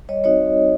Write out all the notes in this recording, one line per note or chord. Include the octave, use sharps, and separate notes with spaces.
G3 C#5 D#5
C4 D#4 F#4 C#5 D#5